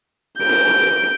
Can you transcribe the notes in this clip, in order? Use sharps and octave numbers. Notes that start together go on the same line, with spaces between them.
G6 D7